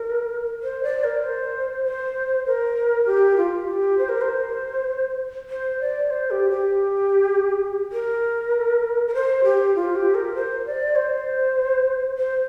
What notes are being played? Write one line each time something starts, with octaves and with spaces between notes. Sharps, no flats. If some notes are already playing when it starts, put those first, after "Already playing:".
Already playing: A#4
C5
D5
A#4
C5
C5
A#4
G4
F4
G4
C5
A#4
C5
C5
D5
C5
G4
G4
A#4
A#4
C5
G4
F4
G4
A#4
C5
D5
C5
C5